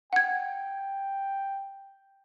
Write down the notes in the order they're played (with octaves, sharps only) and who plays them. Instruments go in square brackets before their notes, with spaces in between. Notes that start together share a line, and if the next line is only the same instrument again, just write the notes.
[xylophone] F#5 G#6 [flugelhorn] G5